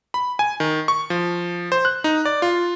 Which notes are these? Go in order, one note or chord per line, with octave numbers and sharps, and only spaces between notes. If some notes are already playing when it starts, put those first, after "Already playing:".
B5
G#5
D#3
C#6
F3
C5
F#6
D#4
D5
F4